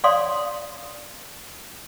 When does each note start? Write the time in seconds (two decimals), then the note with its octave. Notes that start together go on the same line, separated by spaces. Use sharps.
0.04 C#5 D5 F5 C6 D#6